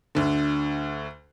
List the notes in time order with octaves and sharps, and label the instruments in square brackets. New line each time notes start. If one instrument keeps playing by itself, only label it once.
[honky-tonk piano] D2 D3